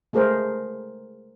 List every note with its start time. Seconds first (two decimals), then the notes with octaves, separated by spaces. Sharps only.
0.13 G#3 A3 G#4 A#4 C5